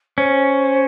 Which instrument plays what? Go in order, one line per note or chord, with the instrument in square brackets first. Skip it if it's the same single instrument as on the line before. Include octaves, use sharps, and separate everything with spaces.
[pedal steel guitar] C#4 [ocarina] C5